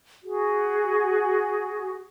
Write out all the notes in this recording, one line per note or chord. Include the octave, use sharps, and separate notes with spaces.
F#4 G#4